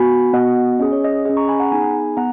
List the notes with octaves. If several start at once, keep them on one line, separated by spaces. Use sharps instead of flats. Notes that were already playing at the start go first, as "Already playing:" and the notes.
Already playing: B3 F#4 G#5 B5
B3 F#4 D#5 F#5
C#4 G#4 D#5
C#5
D#5
C#4 G#4 D#5
A#5 C#6
G#5 B5
F#5 A#5
B3 D#4 G#4 G#5 B5
B3 F#5 A#5